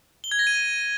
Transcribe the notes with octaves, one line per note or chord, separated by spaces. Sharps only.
G7
G#6
A#6
D#7